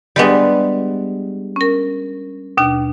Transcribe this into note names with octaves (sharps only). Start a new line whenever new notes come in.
G3 G#3 B3 D4 G4
C#4 A#4
D#2 B2 D4